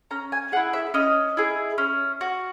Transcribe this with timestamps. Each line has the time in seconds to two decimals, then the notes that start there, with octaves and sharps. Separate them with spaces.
0.11 C#4 A#5
0.32 G#5
0.52 G#4 F#5
0.56 E4
0.73 E5
0.94 C#4 D#5
1.37 E4 G#4
1.78 C#4
2.21 F#4